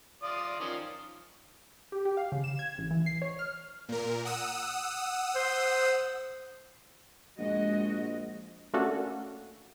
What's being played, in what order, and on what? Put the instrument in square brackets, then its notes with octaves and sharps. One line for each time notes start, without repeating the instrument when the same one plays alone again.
[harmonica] F4 D5 D#6
D#3 F3 C#4
[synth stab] G4
G4
F5
C#3
E7
G#6
A1
E3
C7
C#5
F6
[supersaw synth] A#2 A#4
F#5 D#6 E6
[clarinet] C5
[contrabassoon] A#1 [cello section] G#3 F#4 D#5
[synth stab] A3 A#3 C#4 D4 F#4 A4